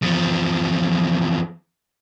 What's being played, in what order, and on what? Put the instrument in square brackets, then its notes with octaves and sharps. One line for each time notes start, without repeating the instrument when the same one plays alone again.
[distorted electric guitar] E2 F3